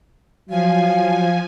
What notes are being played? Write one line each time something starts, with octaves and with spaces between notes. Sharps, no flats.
F3 F#3 F5 G#5